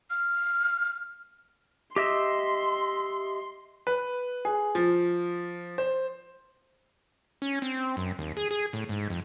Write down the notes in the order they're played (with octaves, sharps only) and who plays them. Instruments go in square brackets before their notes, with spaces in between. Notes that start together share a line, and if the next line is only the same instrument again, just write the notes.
[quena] F6
[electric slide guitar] G4 D#5 E5 [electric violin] C6
[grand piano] B4
G#4
F3
C5
[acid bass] C#4
C4
F#2
D#2
G#4
G#4
A2
G#2
F2